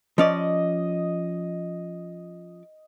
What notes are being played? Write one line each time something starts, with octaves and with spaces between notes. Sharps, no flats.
F3 C#4 D5 D#5